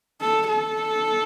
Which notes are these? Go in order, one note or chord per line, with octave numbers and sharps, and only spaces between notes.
A4
A4